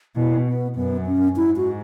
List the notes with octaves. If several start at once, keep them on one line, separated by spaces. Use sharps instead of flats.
B2 E4
B3
F#2 B3
C#4
G#2 E4
F#4